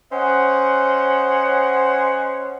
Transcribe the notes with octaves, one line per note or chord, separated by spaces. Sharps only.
C#4 C5 C#5 D#5 F#5